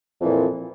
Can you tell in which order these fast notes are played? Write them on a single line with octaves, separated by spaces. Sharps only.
F2 E3 A#2